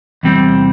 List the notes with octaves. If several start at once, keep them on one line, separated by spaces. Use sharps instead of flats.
E2 C3 G3 C4